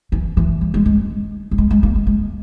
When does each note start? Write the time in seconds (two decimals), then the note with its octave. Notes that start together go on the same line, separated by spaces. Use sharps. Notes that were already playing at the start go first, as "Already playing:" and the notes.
0.12 E3
0.37 E3
0.61 G3
0.74 G#3
0.86 G#3
1.51 G3
1.58 G#3
1.71 G#3
1.83 A#3
1.95 G#3
2.07 G#3